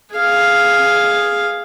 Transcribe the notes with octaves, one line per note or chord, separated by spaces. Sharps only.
G#4 F5